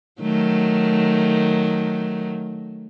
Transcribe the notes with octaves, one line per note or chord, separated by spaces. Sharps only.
D#3 F#3 A3